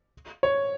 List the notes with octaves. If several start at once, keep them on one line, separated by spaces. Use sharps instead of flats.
C#5